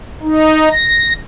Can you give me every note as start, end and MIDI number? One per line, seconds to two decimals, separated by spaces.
0.23 0.69 63
0.72 1.13 94